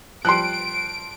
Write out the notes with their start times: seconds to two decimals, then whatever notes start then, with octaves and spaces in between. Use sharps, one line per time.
0.25 F3 G3 C6 F#6 D7